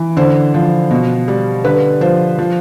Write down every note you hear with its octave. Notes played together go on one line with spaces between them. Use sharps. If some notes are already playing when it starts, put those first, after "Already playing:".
Already playing: E3
D3 C5
F3
B2
G3
D3 B4
F3 C5
F3